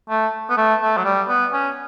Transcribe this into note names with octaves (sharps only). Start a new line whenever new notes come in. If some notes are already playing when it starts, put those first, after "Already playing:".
A3
B3
A3
A3
F#3
G3
B3
C#4